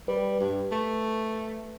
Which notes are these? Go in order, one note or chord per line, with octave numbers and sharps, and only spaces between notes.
G3 B4
G2
A3